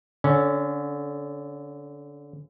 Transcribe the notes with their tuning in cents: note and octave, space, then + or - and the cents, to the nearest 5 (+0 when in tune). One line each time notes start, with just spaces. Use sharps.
D3 -20 C#4 +0